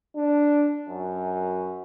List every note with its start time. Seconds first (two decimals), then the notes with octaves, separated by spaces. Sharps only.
0.16 D4
0.89 F#2